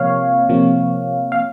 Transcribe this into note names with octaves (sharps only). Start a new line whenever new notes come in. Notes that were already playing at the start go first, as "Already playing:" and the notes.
Already playing: C3 F3 A#3 C#5 F5
C3 F3 A#3
F5